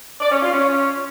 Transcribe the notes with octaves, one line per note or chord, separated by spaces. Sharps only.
D5
C#4
F4
C#4